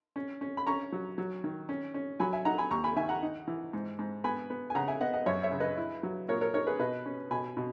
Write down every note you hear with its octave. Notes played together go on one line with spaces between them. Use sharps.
C#4
C#4
B5
C#4 A#5 C#6
F#3
F#3
D#3
C#4
C#4
F#3 G#5 B5
E5 G#5
D#4 F#5 A#5
G#5 B5
D#2 A#5 C#6
G#5 B5
D#3 E5 G#5
F#5 A#5
D#4
E3
G#2
G#2
B3 G#5 B5
B3
G#5
C#3 F#5 A#5
E5 G#5
B3 D#5 F#5
D#5 F#5
F#2 C#5 E5
C#5 E5
C#3
B4 D#5
E4
F#3
A#2 A#4 C#5
A#4 C#5
D#4 A#4 C#5
G#4 B4
B2 B4 D#5
C#4
B2 G#5 B5
B2